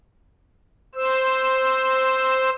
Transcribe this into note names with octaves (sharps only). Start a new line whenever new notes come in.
C5 E6